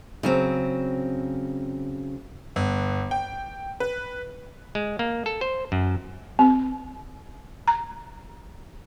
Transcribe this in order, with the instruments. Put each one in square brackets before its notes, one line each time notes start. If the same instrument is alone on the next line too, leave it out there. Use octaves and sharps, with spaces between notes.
[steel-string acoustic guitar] C#3 F#3 C4
[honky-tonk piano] G1
G5
B4
[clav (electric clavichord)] G#3
A#3
A4
C5
F#2
[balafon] C4
A#5